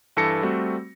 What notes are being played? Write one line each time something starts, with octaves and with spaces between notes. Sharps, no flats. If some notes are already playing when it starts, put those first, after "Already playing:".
G2 E3 A4 A5 A#6 C#7
G3 A3 C4 F#4